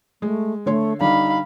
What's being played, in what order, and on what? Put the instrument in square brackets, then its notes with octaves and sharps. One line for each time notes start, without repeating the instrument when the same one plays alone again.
[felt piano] G#3 [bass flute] A3
[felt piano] D3 C#5 C6 [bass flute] A3
[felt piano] D3 G3 [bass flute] D#4 [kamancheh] F5 B5